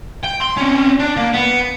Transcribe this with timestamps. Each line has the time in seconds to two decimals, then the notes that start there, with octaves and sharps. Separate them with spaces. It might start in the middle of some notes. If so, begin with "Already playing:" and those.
0.23 G5
0.40 C6
0.57 C4 C#4
0.99 D4
1.16 A#3
1.34 B3